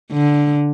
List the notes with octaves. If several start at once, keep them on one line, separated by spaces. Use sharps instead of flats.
D3